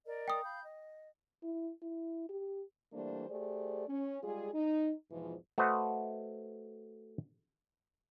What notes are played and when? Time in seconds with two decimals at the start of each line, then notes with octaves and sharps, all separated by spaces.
0.06 A#4 D5 D#5
0.28 G5 D#6
0.44 F5 B5 G6
0.63 D#5
1.43 E4
1.82 E4
2.29 G4
2.93 E3 G3 A3 A#3 D4 C5
3.29 A3 G4 G#4 C5 D5
3.88 C#4
4.23 G3 G#3 F4 G#4
4.54 D#4
5.10 E2 G#2 B2 E3 F3
5.58 A3 F#4 B4 C5 D#5 F#5